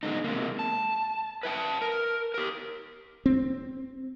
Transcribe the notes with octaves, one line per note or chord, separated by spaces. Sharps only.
B2 D3 G#3 D#4
C3 G#3 A#3
A5
B4 E5 G5 A5
A#4
G4 A#4
C4